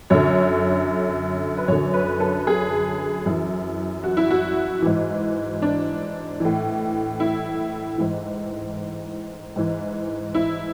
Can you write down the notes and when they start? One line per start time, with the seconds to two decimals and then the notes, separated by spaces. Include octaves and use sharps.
0.10 F#2 D3 C#5
1.57 B4
1.68 F#2 D3 C#5
1.93 B4
2.20 A4
2.47 G#4
3.26 F#2 E3
4.04 F#4
4.17 E4
4.31 F#4
4.82 G#2 E3
5.62 D4
6.40 A2 E3
7.20 E4
7.98 G#2 E3
9.56 G#2 E3
10.35 E4